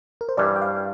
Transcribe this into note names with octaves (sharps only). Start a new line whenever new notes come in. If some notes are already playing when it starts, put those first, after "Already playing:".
A#4
C5
G2 E3 G3 D5
G5
F5